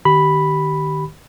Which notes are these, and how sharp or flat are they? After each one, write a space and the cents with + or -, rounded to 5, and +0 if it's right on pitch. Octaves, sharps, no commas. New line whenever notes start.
D#3 -30 G4 -20 B5 +0